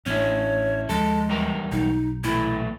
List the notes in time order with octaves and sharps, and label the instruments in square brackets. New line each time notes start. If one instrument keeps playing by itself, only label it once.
[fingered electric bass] A1 A#3 D4 [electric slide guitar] C#4 E4 [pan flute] C#5
[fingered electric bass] D#2 F3 [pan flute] G#3 [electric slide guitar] A4
[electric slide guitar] E2 G3 A#4
[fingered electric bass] B1 [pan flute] D#4
[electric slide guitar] A#2 E3 A3 [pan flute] E4